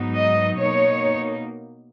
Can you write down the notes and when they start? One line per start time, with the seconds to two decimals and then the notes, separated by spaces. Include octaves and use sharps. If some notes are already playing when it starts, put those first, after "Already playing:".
Already playing: G#2 F#3 B3 D#4
0.16 D#5
0.57 B2 A#3 D#4 C#5